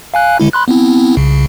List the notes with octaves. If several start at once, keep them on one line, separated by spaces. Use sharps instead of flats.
F5 G#5 F#6
D3 G#3 E4
B5 C6 F#6
B3 C4 E4
C2 C#3